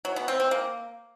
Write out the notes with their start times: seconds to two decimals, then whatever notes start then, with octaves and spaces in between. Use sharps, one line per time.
0.05 F#3
0.16 B3
0.28 C4
0.40 C4
0.51 A#3